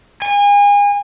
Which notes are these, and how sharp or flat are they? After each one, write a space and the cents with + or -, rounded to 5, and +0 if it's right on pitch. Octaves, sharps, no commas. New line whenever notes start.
G#5 -35